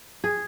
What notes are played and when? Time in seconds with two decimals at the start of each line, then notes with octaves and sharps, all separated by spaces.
0.24 G#4